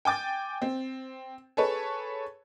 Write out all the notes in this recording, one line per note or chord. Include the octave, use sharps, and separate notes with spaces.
G5 G#5 D6 A6
C4
G#4 A4 B4 C#5